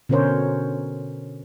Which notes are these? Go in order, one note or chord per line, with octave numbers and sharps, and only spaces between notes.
B2 D3 C#4 A#4 C5 C#5